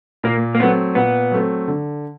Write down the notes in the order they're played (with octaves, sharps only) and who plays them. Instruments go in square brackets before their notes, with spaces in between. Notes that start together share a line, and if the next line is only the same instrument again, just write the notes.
[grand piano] A#2 [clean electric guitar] A#3
[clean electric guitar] A#3
[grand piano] F#3 A3 C4 [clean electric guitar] B3
[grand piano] A#2 [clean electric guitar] B3
[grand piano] F#3 A3 C4
D3